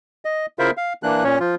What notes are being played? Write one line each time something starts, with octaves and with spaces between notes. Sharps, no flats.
D#5
C#3 E4 F4 A#4 C5 E5
F5
E3 A#3 D4 F#6
A#2 C#4 C#5
F3 F4